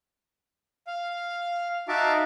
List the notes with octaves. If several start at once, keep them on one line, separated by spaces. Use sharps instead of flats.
F5
D#4 F#4 E5 F5 A5 D6